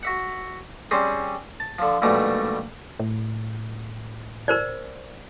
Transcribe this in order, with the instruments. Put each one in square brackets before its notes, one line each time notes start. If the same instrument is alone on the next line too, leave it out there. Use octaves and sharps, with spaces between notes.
[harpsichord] F#4 E5 F#5
G3 C4 C#4 G#4 C5
A5
D3 F3
A#1 G#2 B2 G3 A3
[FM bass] A2
[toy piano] A#4 C5 D5